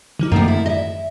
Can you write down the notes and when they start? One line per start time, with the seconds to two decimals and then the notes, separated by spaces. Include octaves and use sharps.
0.19 D3 F3 D#4
0.32 F#2 C3 D#3 A3 A#3
0.48 E4
0.66 D#5 E5